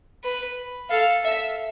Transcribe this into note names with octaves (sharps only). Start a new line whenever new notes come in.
B4
A4 F5
E5